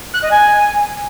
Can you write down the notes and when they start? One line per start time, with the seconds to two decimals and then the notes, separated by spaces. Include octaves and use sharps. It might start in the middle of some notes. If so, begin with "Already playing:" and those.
0.14 F#6
0.22 D#5
0.31 G#5